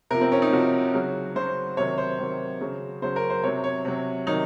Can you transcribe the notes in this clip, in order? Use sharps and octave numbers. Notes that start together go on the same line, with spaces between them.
C3 F3 A#4
C4
C#4
D#4
C3 F3 F#4
C#3 F#3
C#3 F#3 C5
C3 D#3 F#3 C#5
C5
C3 D#3 F#3
C#3 F#3
C#3 F#3 C5
A#4
C5
C3 F#3 C#5
C#5
C3 F#3
C3 D#3 F#3 D#4